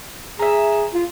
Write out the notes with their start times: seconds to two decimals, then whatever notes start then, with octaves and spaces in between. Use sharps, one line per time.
0.39 G#4 E5 A#5
0.94 F4